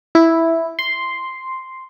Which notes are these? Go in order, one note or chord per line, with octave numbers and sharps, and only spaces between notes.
E4
C6